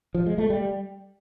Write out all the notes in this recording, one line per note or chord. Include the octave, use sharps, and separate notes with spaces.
F3
G#3
A3
G3